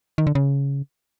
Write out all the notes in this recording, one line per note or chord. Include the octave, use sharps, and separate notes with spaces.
D#3
D3
C#3